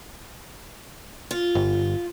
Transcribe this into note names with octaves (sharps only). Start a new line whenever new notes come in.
F4
G1